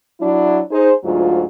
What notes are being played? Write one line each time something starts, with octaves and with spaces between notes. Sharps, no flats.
F#3 D4 E4
D#4 G#4 C5
D2 G#2 F#3 F4